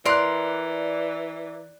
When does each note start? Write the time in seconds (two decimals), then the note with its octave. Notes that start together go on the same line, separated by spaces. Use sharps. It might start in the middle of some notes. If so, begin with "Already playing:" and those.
0.05 E3 A#4 D5 C6 F#6